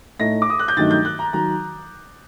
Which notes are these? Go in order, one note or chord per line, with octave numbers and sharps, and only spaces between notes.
A2 A3 D#4 A#6
D6
D#6
F#6
G6
G2 D#3 F#3 A3 D#4 A6
G6
F#6
A#5
D#3 F#3 A#5